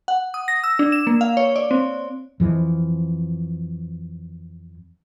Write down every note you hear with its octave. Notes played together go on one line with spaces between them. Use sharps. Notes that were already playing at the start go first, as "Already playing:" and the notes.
F#5
D#6
A#6
E6
D4
E7
A#3
F5
C#5
D5
C4
F2 E3 F3